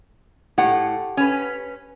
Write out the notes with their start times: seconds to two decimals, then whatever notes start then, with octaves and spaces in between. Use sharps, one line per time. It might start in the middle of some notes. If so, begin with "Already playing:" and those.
0.58 A2 G4 F#5
1.17 C#4 B4